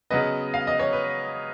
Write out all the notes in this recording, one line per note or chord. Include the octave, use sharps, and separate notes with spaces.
C#3 F#3 B3 B4 D#5
F5
D#5
C#5
B4